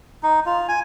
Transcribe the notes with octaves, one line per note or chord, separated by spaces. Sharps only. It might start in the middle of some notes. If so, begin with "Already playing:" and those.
D#4
F4
G#5